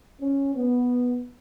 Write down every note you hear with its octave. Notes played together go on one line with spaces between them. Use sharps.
C#4
B3